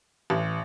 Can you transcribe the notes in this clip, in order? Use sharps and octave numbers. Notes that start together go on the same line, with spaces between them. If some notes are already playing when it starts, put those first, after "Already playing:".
A1